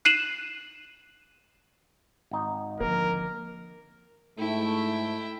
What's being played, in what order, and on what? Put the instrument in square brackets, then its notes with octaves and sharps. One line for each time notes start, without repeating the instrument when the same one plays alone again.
[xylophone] F#6 C7 D#7 E7 F#7
[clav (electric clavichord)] G#1 D#4
[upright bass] D3 F3 [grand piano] A#3 [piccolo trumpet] A#4
[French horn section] G#2 A3 [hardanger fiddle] E4 G5